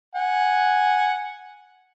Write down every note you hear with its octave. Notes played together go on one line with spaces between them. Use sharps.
F#5 G#5